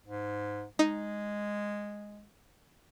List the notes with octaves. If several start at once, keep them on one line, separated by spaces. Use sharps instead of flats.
G#2
G#3 D#4